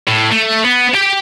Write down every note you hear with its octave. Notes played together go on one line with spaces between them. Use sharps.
A2
A3
B3
G4 G5